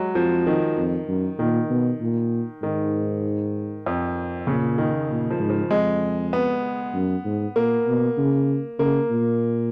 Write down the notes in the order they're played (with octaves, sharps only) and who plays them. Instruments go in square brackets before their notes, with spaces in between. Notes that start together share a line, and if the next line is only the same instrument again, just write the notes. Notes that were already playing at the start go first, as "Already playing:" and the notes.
Already playing: [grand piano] F#3 G#3
[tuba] F2 [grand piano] F3
[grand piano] D#3
[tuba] F2
F#2
[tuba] A#2 [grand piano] D#3
[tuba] B2
A#2
[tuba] G#2 [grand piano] D#3
[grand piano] F2
[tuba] A#2 [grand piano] C#3
[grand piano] D#3
[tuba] A#2
[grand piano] F3
[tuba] G#2
[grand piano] F3
[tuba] F2 [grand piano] G#3
[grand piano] B3
[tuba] F#2
G#2
[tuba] A#2 [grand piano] A#3
[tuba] B2
C#3
[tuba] C#3 [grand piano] A#3
[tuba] A#2